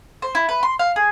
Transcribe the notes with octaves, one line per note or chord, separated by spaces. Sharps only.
C5
E4
B4
C6
F5
G#4